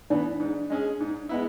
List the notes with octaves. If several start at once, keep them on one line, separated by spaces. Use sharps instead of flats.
E3 B3 D4
G#2
G#3 C#4 G#4
G#2
G#3 B3 E4